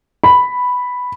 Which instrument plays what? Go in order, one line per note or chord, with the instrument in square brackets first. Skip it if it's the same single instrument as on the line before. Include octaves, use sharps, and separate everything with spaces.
[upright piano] B5